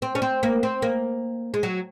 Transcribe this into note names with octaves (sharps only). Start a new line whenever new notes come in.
C4
C#4
C4
A#3
C4
A#3
G#3
F#3